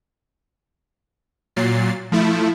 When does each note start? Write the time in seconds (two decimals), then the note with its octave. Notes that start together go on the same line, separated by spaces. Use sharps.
1.56 A#2 F#3 A6 C7
2.12 F3 A3 E4